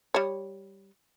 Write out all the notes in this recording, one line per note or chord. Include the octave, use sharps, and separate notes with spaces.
G3 C#5